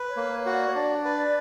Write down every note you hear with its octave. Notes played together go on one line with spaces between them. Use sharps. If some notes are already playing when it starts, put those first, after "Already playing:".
Already playing: B4
C#5
A#3
C#5
F#4
D5
C#5
D4 D5
B4